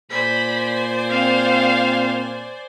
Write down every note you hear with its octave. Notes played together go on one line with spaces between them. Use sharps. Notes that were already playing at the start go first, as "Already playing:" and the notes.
A#2 C5 D5 G#5 B5
C4 F5